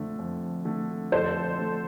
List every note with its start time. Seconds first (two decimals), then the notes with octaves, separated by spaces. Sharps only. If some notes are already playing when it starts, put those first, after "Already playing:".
Already playing: F2 D3 A3
0.19 F2
0.65 D3 A3
1.12 F2 A4 C5
1.58 D3 A3